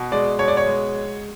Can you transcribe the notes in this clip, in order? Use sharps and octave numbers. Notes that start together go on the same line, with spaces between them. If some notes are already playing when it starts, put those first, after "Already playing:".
Already playing: B2
G#3 D5
B2 C#5
D5
C#5
G#3